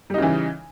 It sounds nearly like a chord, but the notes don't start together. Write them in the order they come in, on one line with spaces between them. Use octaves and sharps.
G3 D#4 C#3 E3